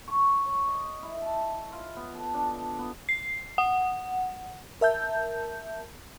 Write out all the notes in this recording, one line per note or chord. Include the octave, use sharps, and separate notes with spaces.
C#6
C#5
D#5
E4
A5
F4
B3
A4
D4
B3
C7
F#5
A#4 E5 A5 G6